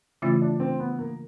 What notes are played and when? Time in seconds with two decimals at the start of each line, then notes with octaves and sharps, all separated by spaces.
0.22 C#3 E3 A3 C#4 E4 F4
0.42 D4
0.60 C4
0.80 B3
0.99 A#3